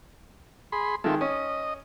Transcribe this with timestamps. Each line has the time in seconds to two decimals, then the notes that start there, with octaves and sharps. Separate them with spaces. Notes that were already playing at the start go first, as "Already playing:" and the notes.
0.72 G#4 B5 C6
1.04 D#3 G#3 F4 A4 E5
1.21 C#4 D#5